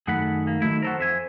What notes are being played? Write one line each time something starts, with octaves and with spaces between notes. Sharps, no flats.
F#2 D#3 A3 G#4 F#5 B5
A#3
D#3 F#3 A3 E4
F#4 A4 A#4 C5
F2 E5 G#5